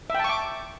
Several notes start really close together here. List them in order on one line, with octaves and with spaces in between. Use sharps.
E5 G5 A5 C#6 D6